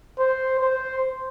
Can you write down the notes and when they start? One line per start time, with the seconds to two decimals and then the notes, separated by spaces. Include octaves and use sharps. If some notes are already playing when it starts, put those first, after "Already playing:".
0.19 C5
0.59 C5